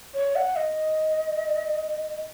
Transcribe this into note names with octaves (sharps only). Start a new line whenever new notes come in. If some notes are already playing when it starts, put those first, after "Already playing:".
C#5
F#5
D#5